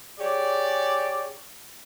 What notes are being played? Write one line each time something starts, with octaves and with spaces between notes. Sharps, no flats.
G4 G#4 C#5 D5